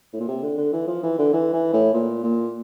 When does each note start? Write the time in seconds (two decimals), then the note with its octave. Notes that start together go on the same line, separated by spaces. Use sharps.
0.13 A2
0.20 A#2
0.28 C3
0.43 D3
0.57 D3
0.73 E3
0.87 F3
1.03 E3
1.19 D3
1.33 E3
1.53 E3
1.73 A2
1.94 A#2
2.23 A#2